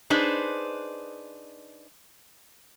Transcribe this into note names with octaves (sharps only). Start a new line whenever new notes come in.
D4 D#4 G#4 B4 C5